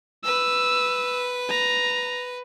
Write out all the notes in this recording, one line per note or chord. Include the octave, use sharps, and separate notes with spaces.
B4 E6
A#5